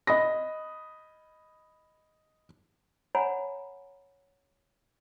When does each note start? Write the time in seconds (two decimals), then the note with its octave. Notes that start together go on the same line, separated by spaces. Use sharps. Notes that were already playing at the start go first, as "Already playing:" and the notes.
0.07 D#5 B5 D#6 A#6
3.15 C#5 F#5 G#5 A#5 B5